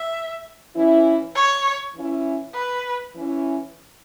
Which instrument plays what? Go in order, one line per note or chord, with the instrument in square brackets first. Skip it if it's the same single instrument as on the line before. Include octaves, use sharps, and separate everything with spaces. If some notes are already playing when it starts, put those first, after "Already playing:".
Already playing: [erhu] E5
[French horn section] E3 C#4 E4
[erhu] C#5
[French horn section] E3 C#4 E4
[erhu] B4
[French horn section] E3 C#4 E4